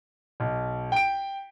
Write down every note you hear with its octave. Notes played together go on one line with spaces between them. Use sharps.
B1
G5 D7